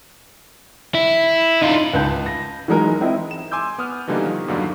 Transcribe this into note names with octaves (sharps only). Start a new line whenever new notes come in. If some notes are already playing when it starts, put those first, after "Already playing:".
E4
D#4 F4
C#2 B4 A5 G6
A#6
E3 F#3 G#3 D#4 A#4
C4 E4 D#5
E7
G#5 C6 D6 E6 G6
B3 D#6 F6
B2 D3 E3 G3 A#3 D#4
D#3 F3
E2 G2 D3 F#3 A#3 D#4